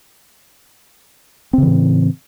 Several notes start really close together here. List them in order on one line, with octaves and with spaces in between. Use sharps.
C4 C#3 E3 A2